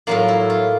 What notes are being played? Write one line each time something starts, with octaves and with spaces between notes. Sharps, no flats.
A2 F#3 A#3 F4
E4
F4